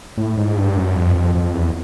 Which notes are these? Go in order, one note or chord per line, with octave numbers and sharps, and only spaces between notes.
A2
G#2
G2
F#2
F2
F2
F2
E2